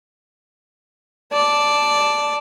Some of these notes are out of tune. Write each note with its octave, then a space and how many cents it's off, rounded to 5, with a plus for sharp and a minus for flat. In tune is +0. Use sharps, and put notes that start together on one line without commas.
D5 +0 A5 -5